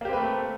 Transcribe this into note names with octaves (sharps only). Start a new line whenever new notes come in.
A3 A#3 C4 G4 B4